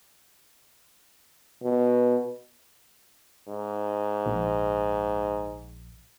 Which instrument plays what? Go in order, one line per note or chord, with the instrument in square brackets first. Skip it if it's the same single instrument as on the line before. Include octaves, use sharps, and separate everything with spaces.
[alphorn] B2
G#2
[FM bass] A#1